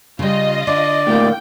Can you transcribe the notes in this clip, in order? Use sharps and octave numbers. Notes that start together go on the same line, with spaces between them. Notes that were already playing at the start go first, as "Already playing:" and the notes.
C#3 G3 F4 D#5
D3 D5
D2 A2 A#3 G5